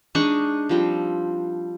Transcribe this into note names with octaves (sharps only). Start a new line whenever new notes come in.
G#3 D4 D#4 C#6
F3 G3 C4